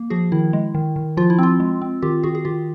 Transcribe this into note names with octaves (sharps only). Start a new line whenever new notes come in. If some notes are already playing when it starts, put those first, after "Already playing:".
Already playing: A#3
F3 F#4 G#4
D#3 E4
G#3
D#3
D#3
F3 F4
E4
C4 F4
G#3
C4
D#3 F4 G4
D#3 F#4 G#4
G#4
D#3 F4 G4